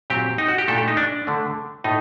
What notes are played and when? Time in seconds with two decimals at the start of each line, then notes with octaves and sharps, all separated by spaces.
0.10 A#2 F#3 C4 G4
0.38 D#4
0.48 F#4
0.58 G4
0.68 A#2 A3 D4 A4
0.78 G4
0.88 D#4
0.97 D4
1.25 D3 A3 D4
1.84 A2 A3 D#4